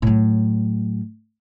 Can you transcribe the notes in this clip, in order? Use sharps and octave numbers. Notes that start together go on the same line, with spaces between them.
A2 F#3